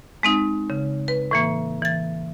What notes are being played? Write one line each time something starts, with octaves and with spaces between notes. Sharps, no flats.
G#3 C4 D#4
C#3
B4
A2 E3 A#3
E3 A6